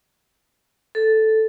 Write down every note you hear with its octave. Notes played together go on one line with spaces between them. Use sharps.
A4